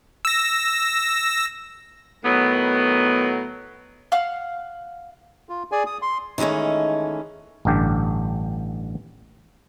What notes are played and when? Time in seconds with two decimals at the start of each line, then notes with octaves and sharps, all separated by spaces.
0.25 E6 A#6
2.24 A2 D#3 F#3 B3
4.12 F5 F#5 F6
5.49 F4
5.72 G#4 D5 G#5
5.86 D#6
6.02 C6
6.38 D#3 E3 G#3 A3 C#4
7.65 A1 G2 D3 G4